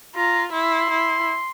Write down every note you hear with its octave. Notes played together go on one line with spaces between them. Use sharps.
F4 A#5
E4 C6
E4